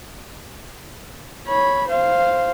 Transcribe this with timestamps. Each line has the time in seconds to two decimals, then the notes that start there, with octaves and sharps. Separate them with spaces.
1.48 C#5 B5
1.89 C5 F5